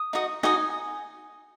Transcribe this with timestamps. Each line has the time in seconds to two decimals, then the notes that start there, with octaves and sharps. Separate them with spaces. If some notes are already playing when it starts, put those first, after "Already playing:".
Already playing: D#6
0.13 D#4 F#4 D#5
0.43 D#4 F#4 D#5 G#5